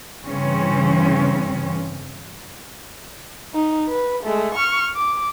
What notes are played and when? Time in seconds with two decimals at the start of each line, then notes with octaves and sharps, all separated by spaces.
0.25 G2 C#3 E3 C4 C#4
3.54 D#4
3.89 B4
4.23 G#3 A3
4.55 C#6 F6
4.96 D6